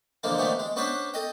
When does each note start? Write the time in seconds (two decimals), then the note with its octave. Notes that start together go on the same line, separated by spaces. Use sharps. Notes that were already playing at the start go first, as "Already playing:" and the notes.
0.23 A#2 D3 E3 F3 G#3 A#3
0.38 A#2 D#3 F3 A3 B3 D4
0.59 G#3
0.76 B3 C#4 D4 B4 C5
1.14 A4 D#5 G5